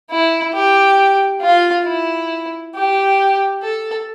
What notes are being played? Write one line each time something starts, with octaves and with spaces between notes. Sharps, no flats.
E4
G4
F4
E4
G4
A4